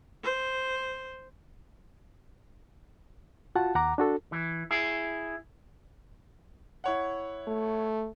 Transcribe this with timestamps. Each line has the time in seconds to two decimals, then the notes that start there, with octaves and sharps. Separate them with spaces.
0.23 C5
3.55 F4 F#4 F#5 A5
3.75 D#2 F#5 A#5 D6
3.98 D4 F#4 A4
4.32 E3
4.71 E4 G#4
6.84 E4 C#5 F#5
7.48 A3